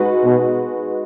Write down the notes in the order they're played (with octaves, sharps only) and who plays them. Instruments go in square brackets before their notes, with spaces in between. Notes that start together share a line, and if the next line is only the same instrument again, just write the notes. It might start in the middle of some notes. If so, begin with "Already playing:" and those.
Already playing: [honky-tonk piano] G#3 D#4 F#4 B4
[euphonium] B2